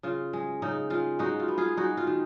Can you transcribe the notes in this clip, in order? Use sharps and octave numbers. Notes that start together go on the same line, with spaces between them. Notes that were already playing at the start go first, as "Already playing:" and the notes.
C#3 F4
G#3
C#3 D#4
G#3 F4
G#3 D#4 F#4
F4
B3
F4 G#4
G#3 D#4 F#4
F4
D#3